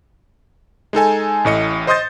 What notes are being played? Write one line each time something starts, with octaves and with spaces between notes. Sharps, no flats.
G#3 D#4 A4 G#5
A1 A2 D#5 C#7
C5 D#5 C6 D#6 G6 A6